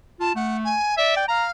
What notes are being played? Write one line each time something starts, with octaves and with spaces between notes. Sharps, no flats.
F4 A5
A3 F#5
G#5
D5 E5
G5
F5 A#5